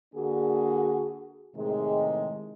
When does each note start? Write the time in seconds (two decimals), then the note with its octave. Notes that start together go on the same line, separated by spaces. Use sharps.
0.15 D3 A#3 D4 F#4 G#4
1.56 A2 C3 D#3 G#3